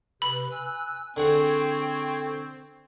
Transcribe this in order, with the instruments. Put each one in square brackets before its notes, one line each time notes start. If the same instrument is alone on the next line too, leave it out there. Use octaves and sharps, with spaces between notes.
[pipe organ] C3 B4 [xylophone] B5
[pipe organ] G#5 E6 F#6
[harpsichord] D3 G#4 F#5 [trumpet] C4 [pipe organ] G5 C#6 G#6